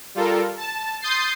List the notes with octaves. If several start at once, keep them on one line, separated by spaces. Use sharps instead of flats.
G3 F4 A4 A#4
A5
C6 D#6 G6 A6 C7